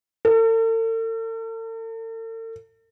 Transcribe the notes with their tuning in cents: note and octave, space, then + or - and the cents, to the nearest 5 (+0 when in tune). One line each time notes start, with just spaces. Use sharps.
A4 +45